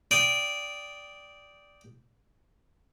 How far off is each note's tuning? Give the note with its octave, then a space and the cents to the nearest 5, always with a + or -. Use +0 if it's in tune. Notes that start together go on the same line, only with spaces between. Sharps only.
D5 -10 G5 +0 D#6 +0